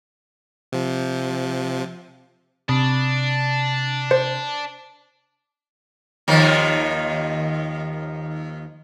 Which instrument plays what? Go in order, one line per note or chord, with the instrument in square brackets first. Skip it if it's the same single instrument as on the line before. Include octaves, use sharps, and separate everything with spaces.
[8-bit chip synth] C3 F3
[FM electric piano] C3 [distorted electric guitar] D4
[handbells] C5
[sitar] D#2 D#3 F3